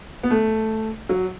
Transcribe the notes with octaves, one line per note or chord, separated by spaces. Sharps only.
B3
A3
F#3